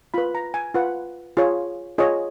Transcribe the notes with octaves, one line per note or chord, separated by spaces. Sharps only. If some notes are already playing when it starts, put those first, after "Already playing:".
F4 B4 B5
A#5
G#5
F4 B4 F#5
F4 G#4 C#5
F4 G#4 C#5 D#5